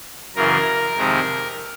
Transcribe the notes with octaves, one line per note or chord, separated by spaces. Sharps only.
F#2 C#3 E3 A#4
F2 C3 D#3 G#3